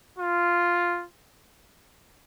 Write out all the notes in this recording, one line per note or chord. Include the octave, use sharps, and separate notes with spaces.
F4